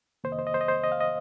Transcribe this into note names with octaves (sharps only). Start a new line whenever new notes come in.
F2 C3 D#3 A#3 C5
D#5
C5
D#5
C5
D#5
C5
D#5
F5
D#5